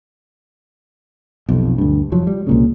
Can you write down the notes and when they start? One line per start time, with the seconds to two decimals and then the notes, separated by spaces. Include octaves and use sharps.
1.49 B1 F2 C3
1.78 D2 G2
2.12 F1 F3 F#3
2.27 G3
2.47 C2 A#2 C#3